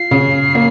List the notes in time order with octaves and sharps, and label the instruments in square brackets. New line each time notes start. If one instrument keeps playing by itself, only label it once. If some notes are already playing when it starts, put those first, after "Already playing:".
Already playing: [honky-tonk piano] F4 [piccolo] C7
[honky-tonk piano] C#3
A#3